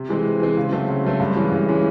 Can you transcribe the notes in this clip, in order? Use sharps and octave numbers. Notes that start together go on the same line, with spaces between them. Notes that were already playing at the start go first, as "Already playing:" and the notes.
Already playing: C3
E3 G#3 C4
C3
E3 G#3 C4
C#3
F#3 A3 C4
C#3
F#3 A3 C4
G2
E3 G#3 C#4
G2
E3 G#3 C#4